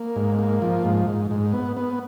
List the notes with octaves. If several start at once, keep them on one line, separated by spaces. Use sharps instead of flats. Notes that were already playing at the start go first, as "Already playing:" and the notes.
Already playing: A#3
G#2
A#3
F3
G#2
G#2
G#2
B3
B3